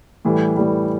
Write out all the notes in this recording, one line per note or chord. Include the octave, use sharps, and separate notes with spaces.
A2 E3 G3
A2 E3 G3